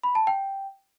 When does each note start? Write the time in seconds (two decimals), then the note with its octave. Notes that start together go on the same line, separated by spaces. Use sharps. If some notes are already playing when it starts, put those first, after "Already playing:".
0.04 B5
0.15 A5
0.27 G5